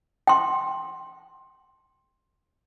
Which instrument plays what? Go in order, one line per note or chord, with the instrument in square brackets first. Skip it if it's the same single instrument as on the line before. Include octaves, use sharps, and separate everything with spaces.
[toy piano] G5 C6